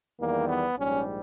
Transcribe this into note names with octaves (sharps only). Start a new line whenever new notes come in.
E2 D#3 G3 A#3
B3
A#1 G#2 G3 C#4